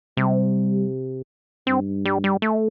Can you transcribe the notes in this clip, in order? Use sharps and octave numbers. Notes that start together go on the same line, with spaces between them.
C3 G3
G2 C4
G3
G3
A3